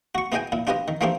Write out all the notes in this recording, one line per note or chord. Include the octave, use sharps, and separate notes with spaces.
F#4 C#6
B3 E4 G#4 D#5 G5 G#5
A#2 E4
D4 F4 G4 B4 D#5
D#3
E3 A3 A#3 C4 D4 G4